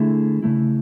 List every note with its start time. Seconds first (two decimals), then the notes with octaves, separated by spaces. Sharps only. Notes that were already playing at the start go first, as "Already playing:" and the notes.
Already playing: D3 A3 E4 G#4
0.42 C#3 E3 A3 E4